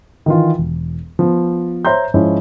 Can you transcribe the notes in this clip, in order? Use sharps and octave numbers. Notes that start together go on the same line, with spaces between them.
D#3 E3 F4
E1
F3 B3
C5 C#5 E5 A#5 C6 G6
G#2 F3 C#4 E4 F4